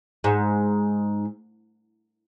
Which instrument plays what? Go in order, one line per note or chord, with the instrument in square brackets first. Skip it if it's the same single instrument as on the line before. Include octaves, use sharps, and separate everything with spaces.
[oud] G#2